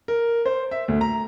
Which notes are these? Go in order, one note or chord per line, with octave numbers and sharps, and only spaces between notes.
A#4
C5
E5
D2
A#5